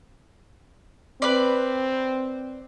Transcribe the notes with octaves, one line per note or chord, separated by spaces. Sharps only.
C4 B4 D5